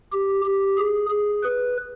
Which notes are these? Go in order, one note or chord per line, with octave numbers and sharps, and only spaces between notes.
G4
G4
G#4
G#4
B4